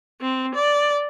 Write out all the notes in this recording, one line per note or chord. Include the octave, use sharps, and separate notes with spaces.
C4
D5